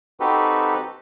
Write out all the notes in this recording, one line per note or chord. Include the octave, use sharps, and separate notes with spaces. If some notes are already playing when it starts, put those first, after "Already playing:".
C4 D#4 F#4 G4 A4 B4